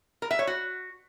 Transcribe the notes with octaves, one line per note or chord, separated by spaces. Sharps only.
A#4
E5
C#5
F#4